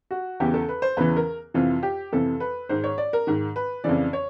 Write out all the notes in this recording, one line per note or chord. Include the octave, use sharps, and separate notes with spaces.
F#4
E2 C#3 E3 G4
A4
B4
C5
E2 C#3 E3 B4
A#4
F2 C3 E3 F4
G4
F2 C3 E3 A4
B4
G#2 D#3 C5
C#5
D5
A#4
G#2 D#3
B4
F2 C#3 E3 D5
C#5